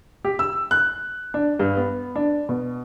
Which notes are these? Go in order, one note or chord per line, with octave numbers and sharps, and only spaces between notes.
G4
E6
F#6
D4
G2
B3
D4
B2